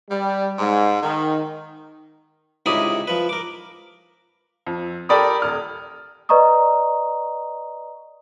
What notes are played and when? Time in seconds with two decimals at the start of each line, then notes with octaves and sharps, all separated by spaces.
0.10 G3
0.58 G#2
1.02 D#3
2.66 C#2 C3 D#4 E4 D5 D#6
3.07 F3 B4
3.29 A#4 D6
4.67 F2
5.09 G4 A4 A#4 D5 B5 D#6
5.42 D#1 F6
6.29 B4 D5 D#5 A#5 C#6 D#6